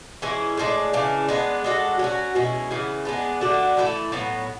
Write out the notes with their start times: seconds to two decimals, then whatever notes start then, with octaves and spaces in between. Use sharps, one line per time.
0.22 E3 G#3 C#4 E4
0.57 A2 G#3 D4
0.93 C#3 E3 G#3 D4
1.29 G#3 B3 D4
1.64 G#3 D4 F#4 A4
1.99 F#3 C#4 F#4
2.35 B2 G#3 C#4 E4
2.71 C#3 E3 B3
3.05 G#3 B3 D4
3.41 D3 A3 D4 F#4
3.77 E3 A3 E4 A4
4.12 A2 F#3 B3